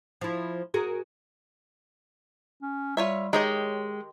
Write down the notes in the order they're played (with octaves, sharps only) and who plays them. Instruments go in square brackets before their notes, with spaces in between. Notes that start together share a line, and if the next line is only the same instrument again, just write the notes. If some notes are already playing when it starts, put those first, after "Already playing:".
[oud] F3 E4
F#4 G#4 A#4
[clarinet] C#4
[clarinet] G3 [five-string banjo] F4 C#5 E5
[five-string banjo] D#3 G4 D#5 [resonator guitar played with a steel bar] G#3 [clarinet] C#5